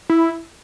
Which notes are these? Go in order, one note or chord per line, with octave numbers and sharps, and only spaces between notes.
E4